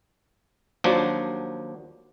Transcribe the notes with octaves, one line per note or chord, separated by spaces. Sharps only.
D#2 F3 F#3 D4